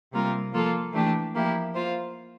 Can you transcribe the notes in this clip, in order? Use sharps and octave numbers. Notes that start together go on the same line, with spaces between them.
C3 G3 A#3 F4 A#4
F3 A#3 F4 A4
E3 A3 D4 G4
F3 A#3 E4 G4
A#3 F4 C5